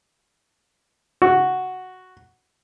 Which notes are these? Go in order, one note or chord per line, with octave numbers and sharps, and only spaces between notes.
F#4